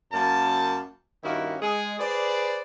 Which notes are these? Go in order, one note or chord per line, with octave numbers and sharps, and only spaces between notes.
F#2 A#3 A5
G2 D#3 A#3 C#4 E4 F#4
G#3 G#4
G#4 B4 C5 D5